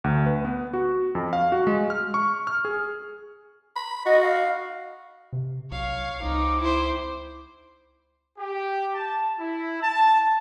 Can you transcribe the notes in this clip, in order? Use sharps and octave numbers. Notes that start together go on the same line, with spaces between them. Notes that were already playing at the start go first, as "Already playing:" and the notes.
D2
B4
B3
F#4
F2
F5
F#4
G#3
F6
C#6
F6
G#4
B5
F#4 D#5
F5
C3
B1 C#5 F5
C#2 C4 D#4 D6
E4 C5
G4
A5
E4
A5